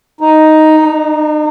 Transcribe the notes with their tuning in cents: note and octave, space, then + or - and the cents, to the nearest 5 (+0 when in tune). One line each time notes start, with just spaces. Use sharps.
D#4 +5
D#4 -45